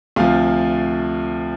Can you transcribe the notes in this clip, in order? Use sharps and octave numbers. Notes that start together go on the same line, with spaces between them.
D2 C3 F3 F5